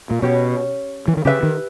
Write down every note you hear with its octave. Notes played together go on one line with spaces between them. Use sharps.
A#2
B2 C#4 G4 C#5
E3
D#3
C#3 G4 B4 E5
D#3